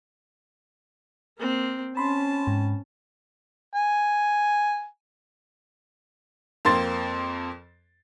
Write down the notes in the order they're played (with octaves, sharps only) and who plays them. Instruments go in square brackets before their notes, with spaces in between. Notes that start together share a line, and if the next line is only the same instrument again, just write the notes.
[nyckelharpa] A#3 C4
[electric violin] C#4 [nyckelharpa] A5 [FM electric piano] B5 C6
[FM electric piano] G#2
[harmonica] G#5
[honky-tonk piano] F2 A#3 C4 C6 A6